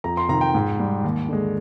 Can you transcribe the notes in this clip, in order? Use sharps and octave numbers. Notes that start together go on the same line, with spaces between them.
F2 A#5
C6
C3 D#3 A#5
G5
G#2
G3
D#2
D3 G#3